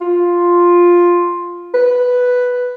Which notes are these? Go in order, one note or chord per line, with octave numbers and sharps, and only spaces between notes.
F4
B4